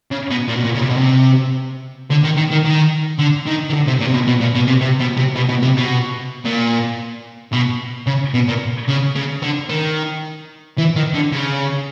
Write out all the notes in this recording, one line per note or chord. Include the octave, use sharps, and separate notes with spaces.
C#3
B2
A#2
B2
A#2
C#3
C3
B2
C3
D3
D#3
D#3
D#3
D#3
D3
D#3
D#3
D3
C3
A#2
C3
B2
B2
A#2
B2
C3
C3
B2
C3
B2
B2
C3
B2
A#2
B2
C#3
B2
A#2
C#3
C#3
D3
D#3
E3
D#3
D3
C#3